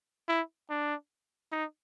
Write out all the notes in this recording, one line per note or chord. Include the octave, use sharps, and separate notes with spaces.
E4
D4
D#4